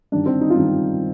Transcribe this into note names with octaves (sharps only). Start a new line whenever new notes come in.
G2 D#3 D4
C4
D#4
F4
G2 D#3 D#4